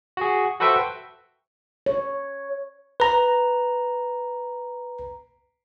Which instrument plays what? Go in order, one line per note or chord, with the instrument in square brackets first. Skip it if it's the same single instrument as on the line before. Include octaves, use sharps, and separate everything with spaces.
[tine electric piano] F#4 G#4
F#4 A4 B4 C5 E5 G5
[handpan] C#5
[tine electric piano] B4 A#5